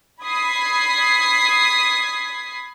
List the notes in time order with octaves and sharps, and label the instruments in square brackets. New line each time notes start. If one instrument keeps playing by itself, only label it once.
[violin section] B5 D#6 G#6 B6 C7